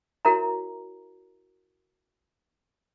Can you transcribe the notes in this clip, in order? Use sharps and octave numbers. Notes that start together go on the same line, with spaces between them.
E4 F#4 A#4 C#5 E5 A#5